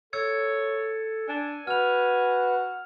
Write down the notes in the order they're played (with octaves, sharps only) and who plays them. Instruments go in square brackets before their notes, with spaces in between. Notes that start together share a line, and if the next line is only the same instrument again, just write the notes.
[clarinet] A4 [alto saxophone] C#5 [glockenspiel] E6 G#6 C#7
[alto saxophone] D4 [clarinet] G#5
[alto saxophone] F#4 [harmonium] B4 [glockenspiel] F6 F7